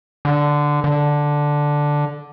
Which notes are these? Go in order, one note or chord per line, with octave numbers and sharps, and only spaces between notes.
D3
D3